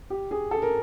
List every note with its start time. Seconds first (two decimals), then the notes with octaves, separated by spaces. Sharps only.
0.10 G4
0.31 G#4
0.51 A4
0.62 A#4